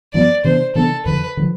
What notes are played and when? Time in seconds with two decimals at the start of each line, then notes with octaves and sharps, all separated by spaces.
0.14 G2 F3 B3 D5
0.44 C3 E3 B3 D4 C5
0.75 C3 E3 B3 D4 A4
1.05 F2 D3 F3 B4
1.37 D3 F3